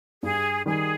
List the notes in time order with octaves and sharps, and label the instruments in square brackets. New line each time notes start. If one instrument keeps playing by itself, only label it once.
[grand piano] G2 [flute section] G#4
[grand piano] D#3 G3 [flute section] G#4